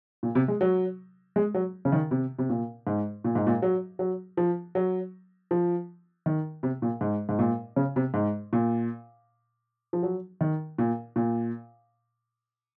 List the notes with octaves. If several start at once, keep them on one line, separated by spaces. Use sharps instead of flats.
A#2
C3
G#3
F#3
G#3
F#3
C#3
D#3
C3
C3
A#2
G#2
A#2
G#2
A#2
F#3
F#3
F3
F#3
F3
D#3
C3
A#2
G#2
G#2
A#2
C#3
C3
G#2
A#2
F3
F#3
D#3
A#2
A#2